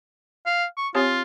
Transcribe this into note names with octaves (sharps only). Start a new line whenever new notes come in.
F5
C#6
C4 F4 G4 C#5